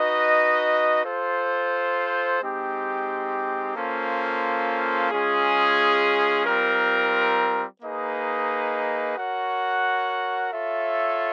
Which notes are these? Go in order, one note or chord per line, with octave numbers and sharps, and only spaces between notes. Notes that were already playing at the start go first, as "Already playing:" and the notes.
Already playing: D#4 F#4 B4 D#5
F4 A4 C5
G#3 C4 D#4 G4
A#3 C#4 F4 A4 C5
G#3 C#4 F4 G#4
G3 C4 F4 A#4
A#3 D#4 G#4 B4 D#5
F#4 A#4 C#5 F#5
F4 A4 C#5 E5